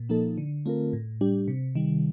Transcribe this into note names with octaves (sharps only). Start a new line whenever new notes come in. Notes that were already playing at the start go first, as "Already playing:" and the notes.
Already playing: A#2
F3 A#3 D#4 A4
D3
A3 C4 F4 A#4
A2
G3 D4 G4
C3
D#3 G3